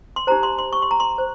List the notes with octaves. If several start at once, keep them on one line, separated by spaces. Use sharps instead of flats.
C6
D#4 G4 C5 A#5
C6
C6
C#6
C6
A#5
C6
C5